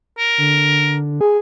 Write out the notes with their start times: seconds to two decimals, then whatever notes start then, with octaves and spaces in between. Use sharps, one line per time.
0.18 A#4
0.38 D3
1.21 G#4